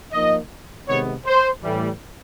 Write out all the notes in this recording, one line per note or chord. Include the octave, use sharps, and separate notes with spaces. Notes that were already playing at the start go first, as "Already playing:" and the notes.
F3 A#3 D#4 D#5
C3 D#3 G#3 B3 C#5
C5
A2 E3 G3